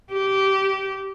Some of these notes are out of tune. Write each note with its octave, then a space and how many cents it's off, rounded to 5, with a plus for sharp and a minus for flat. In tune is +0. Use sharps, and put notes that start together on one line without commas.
G4 -20